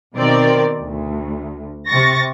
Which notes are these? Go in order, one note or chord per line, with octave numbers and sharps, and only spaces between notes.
B2 D#3 C4 A#4 D5
D2
C3 C#6 A6 A#6